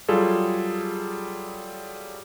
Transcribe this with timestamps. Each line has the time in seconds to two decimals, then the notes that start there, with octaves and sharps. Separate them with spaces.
0.08 F#3 G3 F4 G#4 A4